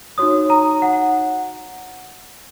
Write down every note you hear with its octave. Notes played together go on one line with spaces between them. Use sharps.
D#4 F#4 C#5 D#6
A#5
F#5